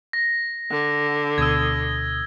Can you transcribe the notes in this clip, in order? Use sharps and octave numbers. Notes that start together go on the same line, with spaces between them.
A#6
D3 F#5
D2 B2 D#6 E6 G#6